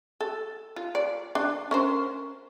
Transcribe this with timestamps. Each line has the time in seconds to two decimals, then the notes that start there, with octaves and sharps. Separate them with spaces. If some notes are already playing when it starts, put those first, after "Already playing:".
0.21 A4
0.76 F4
0.95 D5
1.35 D4
1.71 C#4 A#4 C5